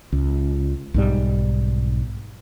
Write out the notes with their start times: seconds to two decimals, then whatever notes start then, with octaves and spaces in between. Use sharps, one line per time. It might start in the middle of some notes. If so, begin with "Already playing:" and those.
0.12 C#2
0.94 B1 G#2 G3